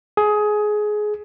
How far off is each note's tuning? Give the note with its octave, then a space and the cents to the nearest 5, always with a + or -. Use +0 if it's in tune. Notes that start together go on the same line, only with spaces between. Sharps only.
G#4 +20